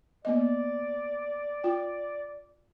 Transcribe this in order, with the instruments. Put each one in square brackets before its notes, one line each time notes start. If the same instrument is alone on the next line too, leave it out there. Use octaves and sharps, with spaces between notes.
[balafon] A#3 B3 D#5 [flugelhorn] D5
[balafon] F4 G5